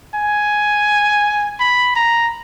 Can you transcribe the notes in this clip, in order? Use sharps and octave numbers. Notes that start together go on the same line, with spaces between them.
G#5
B5
A#5